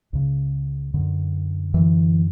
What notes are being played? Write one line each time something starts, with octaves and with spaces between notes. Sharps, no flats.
C#2 C#3
F#2 D3
F#2 D3 E3